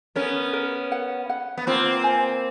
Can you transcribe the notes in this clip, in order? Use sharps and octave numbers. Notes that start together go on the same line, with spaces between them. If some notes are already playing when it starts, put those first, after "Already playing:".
B3 C#4 A#4
A#4
F#5
F#5
B3
A#3 C4 F4
G#5